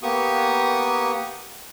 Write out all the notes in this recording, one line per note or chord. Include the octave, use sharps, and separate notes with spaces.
A#3 B3 G4 C#6 D#6